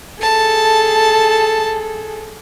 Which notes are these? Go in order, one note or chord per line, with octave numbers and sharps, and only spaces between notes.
G#4 A4 A5